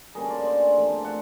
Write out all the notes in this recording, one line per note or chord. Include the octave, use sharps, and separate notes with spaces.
D3 G3 A#3 C#4 G#4 A#4
C5 D5
C5 D5
D3 F3 A3 C4
E5 F#5